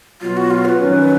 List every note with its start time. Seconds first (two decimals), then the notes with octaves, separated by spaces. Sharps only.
0.22 B2 F#3 B3 F4
0.37 F#4
0.50 F4
0.65 C#5
0.69 B4
0.79 F2 D#3 F#3 C#4